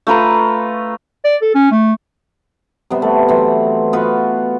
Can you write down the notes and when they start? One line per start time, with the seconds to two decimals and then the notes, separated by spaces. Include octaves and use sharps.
0.07 A3 F4 B4 A#5
1.25 D5
1.42 A4
1.55 C#4
1.71 A3
2.90 C3 G3 B3
3.02 A3
3.28 E3 F#3 C4 C5
3.93 B3 F4 F#4 B4